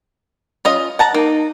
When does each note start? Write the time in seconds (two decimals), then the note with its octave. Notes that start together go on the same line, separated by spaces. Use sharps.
0.65 C#4 F4 D#5
0.99 F#5 A5 A#5
1.14 A#3 D#4